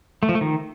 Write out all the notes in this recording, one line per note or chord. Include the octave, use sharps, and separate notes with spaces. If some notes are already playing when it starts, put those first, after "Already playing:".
A3
F3
A3
D#3